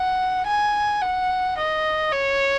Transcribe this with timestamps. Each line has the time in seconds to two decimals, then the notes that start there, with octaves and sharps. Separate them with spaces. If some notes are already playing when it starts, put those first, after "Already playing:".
Already playing: F#5
0.47 G#5
1.01 F#5
1.58 D#5
2.12 C#5